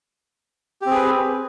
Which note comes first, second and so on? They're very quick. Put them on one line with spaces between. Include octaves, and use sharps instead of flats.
G4 C4 G#4 B4